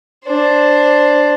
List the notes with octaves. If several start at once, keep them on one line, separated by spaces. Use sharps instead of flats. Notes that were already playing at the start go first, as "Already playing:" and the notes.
D4 C5